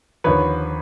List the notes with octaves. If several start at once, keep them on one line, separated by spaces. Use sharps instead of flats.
D#2 D3 F3 B4 C#5